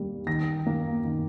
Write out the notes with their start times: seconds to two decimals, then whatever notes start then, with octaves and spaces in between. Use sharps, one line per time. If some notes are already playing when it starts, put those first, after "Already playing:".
Already playing: D#3 G3 A#3
0.27 D#3 A#6
0.67 A#3
1.04 D#3